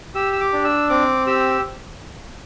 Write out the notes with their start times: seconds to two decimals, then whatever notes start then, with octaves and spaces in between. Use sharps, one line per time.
0.15 G4 E6
0.33 E6
0.41 D6
0.53 D4
0.64 E6
0.90 C4 D6
1.27 G4 E6